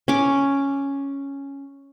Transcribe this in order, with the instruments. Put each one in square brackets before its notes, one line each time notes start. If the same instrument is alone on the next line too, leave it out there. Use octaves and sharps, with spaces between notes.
[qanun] C#4 D6